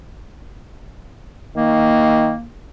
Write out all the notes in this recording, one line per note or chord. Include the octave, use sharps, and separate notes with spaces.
D#3 A#3